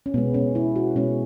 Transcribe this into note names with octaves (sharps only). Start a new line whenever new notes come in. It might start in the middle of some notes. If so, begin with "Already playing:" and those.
C#4
B2 G#3 B3
C#4
E4
F#4
B2 G#3 C#4